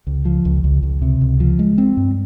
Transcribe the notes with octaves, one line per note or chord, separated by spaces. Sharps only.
C#2
F3
C#2
C#2
C#2
C3
C#2
F3
G#3
C4
G2